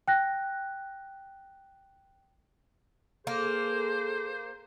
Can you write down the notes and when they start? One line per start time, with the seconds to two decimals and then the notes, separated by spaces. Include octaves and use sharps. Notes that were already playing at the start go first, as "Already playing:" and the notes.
0.08 G5 F#6 A#6
3.27 A#3 G#4 A4 C5